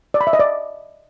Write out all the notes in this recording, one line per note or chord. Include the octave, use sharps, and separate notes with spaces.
D5
B5
E5
D#5
D5